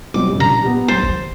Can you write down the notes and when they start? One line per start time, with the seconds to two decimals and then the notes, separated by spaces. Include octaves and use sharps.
0.14 B2 F#3 G3 C4 D6
0.28 F#1 G4
0.40 A#2 D4 A#5
0.63 B3 G4
0.88 F#3 C5 A6
1.03 G#1